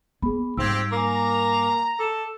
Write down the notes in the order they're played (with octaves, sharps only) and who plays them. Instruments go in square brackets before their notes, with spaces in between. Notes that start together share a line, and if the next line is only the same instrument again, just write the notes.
[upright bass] B3 [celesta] G#4 B5
[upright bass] G#2 G3 [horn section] C4 F4 G4 [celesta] E6 G#6
[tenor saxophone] A#3 [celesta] G#5 D6 [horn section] A#5
[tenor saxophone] A4 [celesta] D6 E7